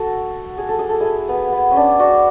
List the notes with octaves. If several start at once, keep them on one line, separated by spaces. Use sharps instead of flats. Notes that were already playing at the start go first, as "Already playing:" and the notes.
Already playing: F#4 A4
G#4
A4
G#4
A4
E4 G#4
B3
B3
C#4
D4
D4 F#4